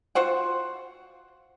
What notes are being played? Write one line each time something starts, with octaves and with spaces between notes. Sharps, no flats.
F4 F#4 C5 F#5